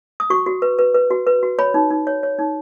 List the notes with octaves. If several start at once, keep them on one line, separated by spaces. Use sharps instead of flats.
D#6
F#4 C#6
F#4
B4
B4
B4
F#4
B4
F#4
C#5 B5
D#4
D#4
C#5
C#5
D#4